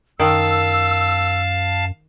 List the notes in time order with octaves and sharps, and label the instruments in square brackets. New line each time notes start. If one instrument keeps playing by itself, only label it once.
[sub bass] F#2 [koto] D#3 [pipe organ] F5 A5 [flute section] E6